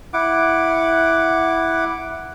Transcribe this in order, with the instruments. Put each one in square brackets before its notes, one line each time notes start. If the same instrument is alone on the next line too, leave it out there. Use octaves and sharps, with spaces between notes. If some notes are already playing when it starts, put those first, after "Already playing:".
[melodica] E4 F#5 D6